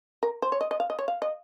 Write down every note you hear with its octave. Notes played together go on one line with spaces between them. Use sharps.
A#4
C5
C#5
D#5
D#5
F5
D#5
C#5
F5
D#5